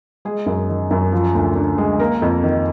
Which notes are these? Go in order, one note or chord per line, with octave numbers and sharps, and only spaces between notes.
G#3 G#4
F#2
D#3
F#2
F3
D2
D3
G#3
A#3 A#4
F2
D#3